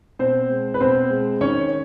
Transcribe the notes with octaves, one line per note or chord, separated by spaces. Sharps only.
B2 C4 C5
G#3
B4
B2 C4 C5
G#3
D#3 C#4 C#5